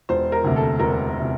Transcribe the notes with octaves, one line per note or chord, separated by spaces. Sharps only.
E1 C5
A#4
D2 C3
A4
E1 A#4
C3